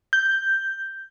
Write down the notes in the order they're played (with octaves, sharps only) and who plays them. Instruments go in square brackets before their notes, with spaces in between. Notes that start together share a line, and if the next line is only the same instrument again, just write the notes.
[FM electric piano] G6